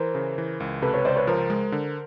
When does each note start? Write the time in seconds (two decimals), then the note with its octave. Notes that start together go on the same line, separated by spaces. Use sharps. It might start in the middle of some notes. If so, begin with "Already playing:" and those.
Already playing: E3 A#4 C5
0.15 C#3
0.38 E3
0.60 C#2
0.82 C3 A4 B4
0.94 B4 C#5
1.05 C#2 C5 D5
1.16 B4 C#5
1.27 F3 A#4 C5
1.50 G#3
1.72 D3